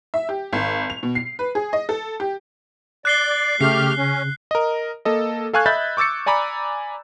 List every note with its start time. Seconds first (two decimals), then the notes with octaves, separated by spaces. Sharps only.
0.14 E5
0.29 G4
0.53 G#1
0.90 F7
1.03 B2
1.15 C7
1.39 B4
1.55 G#4
1.73 D#5
1.89 A4
2.20 G4
3.05 D5 F#6 C7 G7
3.61 C#3 A3 G4 F6 C7
3.97 C#4
4.51 A#4 D#5
5.05 A#3 A4 D#5
5.53 A4 F5 G#5 C#6 F#6 G#6
5.66 D#5 E5 B5 F#6 G6 A6
5.97 C#6 D6 E6 A6 C#7
6.26 D5 G#5 A#5 B5 D6